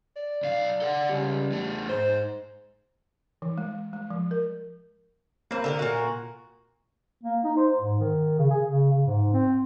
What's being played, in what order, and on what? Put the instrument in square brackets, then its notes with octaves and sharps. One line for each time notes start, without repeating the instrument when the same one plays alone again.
[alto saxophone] D5
[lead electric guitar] B1 F5
A4 F#5
[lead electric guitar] C#2 [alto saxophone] G3
[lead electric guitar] E2 A3
[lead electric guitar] G#2 [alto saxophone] C5
[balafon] E3
G#3
G#3
F3
A#4
[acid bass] A#3 [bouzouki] C4 B4
[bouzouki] D3 G4 A#4
A#2 F#4
[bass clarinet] A#3
D#4
C5
G#2
D#3
C#3
G#4
C#3
C#3
G#2
C4